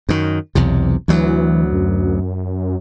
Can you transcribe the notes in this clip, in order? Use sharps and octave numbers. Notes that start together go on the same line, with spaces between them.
F#2 D#3
B1 E2 C3
D2 E3 F#3
F#2